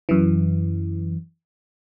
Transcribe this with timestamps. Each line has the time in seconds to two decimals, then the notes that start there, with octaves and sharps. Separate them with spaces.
0.09 F#2 E3